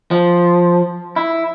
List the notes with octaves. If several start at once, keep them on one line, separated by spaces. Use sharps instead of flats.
F3
E4